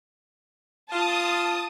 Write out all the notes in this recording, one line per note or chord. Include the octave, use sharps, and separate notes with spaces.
F4 A5 D#6